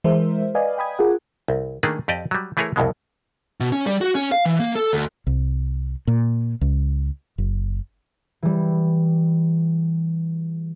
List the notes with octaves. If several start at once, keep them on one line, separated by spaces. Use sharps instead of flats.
E3 G#3 A#4 C5 E5
B4 D5 D#5 F5 G#5
G5 B5 D#6 G#6
F4 G#4 A#4 F#5
C2
D#3 A3 A#3 D4 G#4
F2 G4 D5 D#5
F#3 G3
E3 A3 E4 G#4 A#4 C#5
C2 F2 B2 G#3
B2
C#4
G3
F#4
C#4
F5
E3
A#3
A4
D2
C2
A#2
C#2
F#1
E3 G3